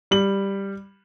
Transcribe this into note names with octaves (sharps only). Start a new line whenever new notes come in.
G3 F#7